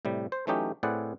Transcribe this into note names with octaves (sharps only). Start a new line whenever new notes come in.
A2 C3 G3
C5
E3 F#3 A3 C#4 D#4 G4
A2 C4 G#4 B4 D5 F#5